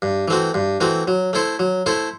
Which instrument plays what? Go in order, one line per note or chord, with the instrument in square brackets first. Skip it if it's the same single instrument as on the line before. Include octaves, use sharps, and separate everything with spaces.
[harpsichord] G2
E3 A3 C4 F#4
G2
E3 A3 C4 F#4
F#3
A3 E4 A4 C5
F#3
A3 E4 A4 C5